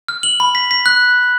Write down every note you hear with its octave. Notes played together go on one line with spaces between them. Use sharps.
F6
F#7
B5
B6
B6
F#6